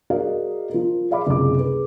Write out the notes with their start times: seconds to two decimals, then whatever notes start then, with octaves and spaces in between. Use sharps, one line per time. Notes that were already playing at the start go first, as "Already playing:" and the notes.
0.10 F#4 G#4 A#4 D5 D#5 F5
0.70 F3 A#4
1.11 G#4 D5 E5 F5 B5 D6
1.27 F#1 C#2 C3 G#4 D6
1.58 G#4 B4